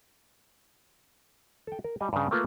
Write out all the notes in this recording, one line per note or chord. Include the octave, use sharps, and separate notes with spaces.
A4 G5
A#4
G3 D#5 G#5
G2 C#3
A3 A#3 F4 B4